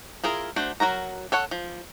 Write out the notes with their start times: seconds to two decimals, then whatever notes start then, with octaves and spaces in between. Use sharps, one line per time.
0.24 E4 F4 G#4 A#4
0.56 A3 D4 F#4 C5
0.80 F#3 F#4 A#4 A#5
1.32 A4 C#5 F#5
1.51 F3